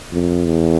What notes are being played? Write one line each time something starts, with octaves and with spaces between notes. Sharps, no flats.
F2
E2